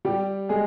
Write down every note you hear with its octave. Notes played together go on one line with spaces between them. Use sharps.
G3 G4
G#3 G#4